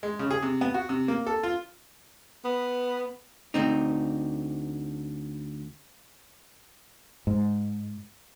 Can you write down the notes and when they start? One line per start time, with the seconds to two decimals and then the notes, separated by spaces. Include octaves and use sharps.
0.03 G#3
0.19 C#3
0.31 G#4
0.42 C3
0.61 B3
0.74 F#4
0.89 C3
1.08 A#3
1.27 A4
1.43 F4
2.45 B3
3.54 D2 C4 D#4
7.27 G#2